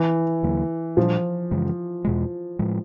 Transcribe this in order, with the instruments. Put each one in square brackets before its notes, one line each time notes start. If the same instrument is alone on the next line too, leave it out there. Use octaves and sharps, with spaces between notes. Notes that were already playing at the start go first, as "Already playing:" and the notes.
Already playing: [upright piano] E3
[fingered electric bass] D#2 D3 F#3 A#3
[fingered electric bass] A#2 G3 B3 D4 [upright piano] F3
[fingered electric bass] F#2 C#3 E3 G#3
E2 B2 G#3
A2 F3 G#3